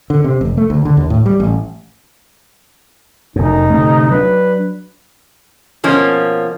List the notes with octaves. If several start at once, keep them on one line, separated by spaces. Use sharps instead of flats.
D3
C3
F1
A3
D2
D3
D#2
A2
G3
A1
F1 F#2 D#4
D1 C3 A3
F#3 D4 B4
B2 F3 A#3 C#4